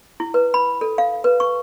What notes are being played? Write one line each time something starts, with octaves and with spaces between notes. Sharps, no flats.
E4
B4
B5
A4
F5
B4
C#6